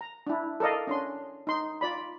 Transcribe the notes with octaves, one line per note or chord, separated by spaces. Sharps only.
A#5
D4 E4
A4 A#4 D5 D#5 F5
C#4 D4 C6
D#4 C6
F4 D5 B5